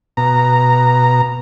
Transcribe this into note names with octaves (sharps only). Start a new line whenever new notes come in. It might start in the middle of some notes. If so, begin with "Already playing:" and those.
B2 A#5